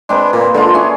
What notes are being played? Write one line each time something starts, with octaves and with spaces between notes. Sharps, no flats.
G#3 C4 D4 B4
A#2 A#3
D3 G#3 D4 F4
C#4 D4 E4 G#4